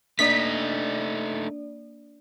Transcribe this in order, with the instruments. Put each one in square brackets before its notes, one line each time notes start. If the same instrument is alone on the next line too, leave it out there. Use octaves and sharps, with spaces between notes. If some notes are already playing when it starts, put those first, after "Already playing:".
[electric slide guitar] A3 D#4 [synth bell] A#3 D4 D5 [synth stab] B6